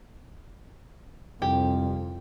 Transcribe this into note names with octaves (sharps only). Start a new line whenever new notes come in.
C2 F2 G4